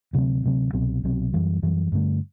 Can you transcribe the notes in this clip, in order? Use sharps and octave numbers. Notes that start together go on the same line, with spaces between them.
D2 C3 F#3 C4
D2 C3 F#3 C4
C2 B2 F#3 C4
C2 B2 F#3 C4
F#2 E3 G3
F#2 E3 G3
G2 D3 A3